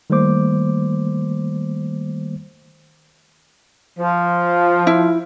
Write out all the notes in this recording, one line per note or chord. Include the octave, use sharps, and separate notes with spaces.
D#3 G3 A3 A#3 C5 D6
F3
E4